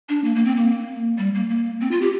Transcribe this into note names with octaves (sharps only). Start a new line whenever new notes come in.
D4
A#3
A#3
C4
A#3
G3
A#3
A#3
C4
F4
G4